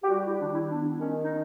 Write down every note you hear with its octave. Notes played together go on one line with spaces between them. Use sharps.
G4
G3 F#4
E4
D#3 D4
E4
B3 D4
D#3 C#4
D#4